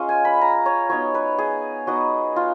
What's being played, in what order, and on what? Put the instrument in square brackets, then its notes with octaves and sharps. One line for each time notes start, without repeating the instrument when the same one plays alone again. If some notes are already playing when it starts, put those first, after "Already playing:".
Already playing: [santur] G#3 C#4 F4 C#5 F5
G#5
B5
A#5
C#5
F#3 B3 D#4 C#5
B4
G#4
F#3 B3 D#4 F#4
F4